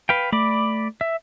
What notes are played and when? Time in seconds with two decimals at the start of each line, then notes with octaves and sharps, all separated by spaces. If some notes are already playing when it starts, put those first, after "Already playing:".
0.09 B4 F5 G5
0.32 A3 D5 B5 D6
1.01 E5